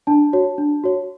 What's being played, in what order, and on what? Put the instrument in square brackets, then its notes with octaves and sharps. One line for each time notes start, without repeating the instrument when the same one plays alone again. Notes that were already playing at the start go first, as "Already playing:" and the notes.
[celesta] D4 A5
F#4 C#5
D4
F#4 C#5